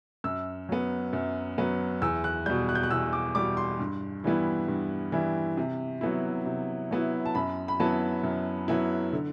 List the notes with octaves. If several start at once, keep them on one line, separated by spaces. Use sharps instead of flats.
F#2 E6
F#3 B3
F#2
F#3 B3
E2 E6
F#6
B2 G3 G6
F#6
G6
F#6
E2 E6
D6
B2 G3 D6
C6
G2
E3 G3 B3 E4
G2
E3 G3 B3 E4
C3
F#3 B3 E4
C3
F#3 B3 E4
A5
F#2 B5
B5
F#3 B3 E4 A5
F#2
F#3 B3 E4
D3